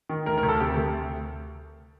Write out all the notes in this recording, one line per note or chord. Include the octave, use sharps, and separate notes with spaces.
D#3
D2 A#4
A#4
D2
A4
C3 G4
D2